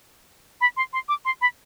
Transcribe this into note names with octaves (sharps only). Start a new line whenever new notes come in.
B5
C6
C6
D6
C6
B5